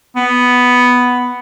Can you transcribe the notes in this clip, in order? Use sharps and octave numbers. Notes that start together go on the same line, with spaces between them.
B3